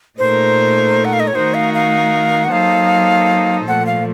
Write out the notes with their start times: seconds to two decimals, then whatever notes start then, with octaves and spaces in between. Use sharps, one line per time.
0.19 A#2 A3 D#4 A#4 C5
1.05 F#5
1.13 F5
1.20 D#5
1.27 C#5
1.35 D#3 A3 D#4 F#4 A#4 C5
1.54 F5
1.74 F5
2.44 F#5
2.51 F#3 A#3 D#4 A4 C5 F5
3.67 A#2 F3 A3 F#5
3.86 F5